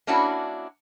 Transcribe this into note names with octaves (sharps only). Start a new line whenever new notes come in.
A#3 C#4 D4 E4 F#4